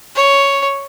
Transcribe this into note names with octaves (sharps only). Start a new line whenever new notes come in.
C#5